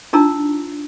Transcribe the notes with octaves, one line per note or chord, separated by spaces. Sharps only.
D4 D#4 F4 A#5 E6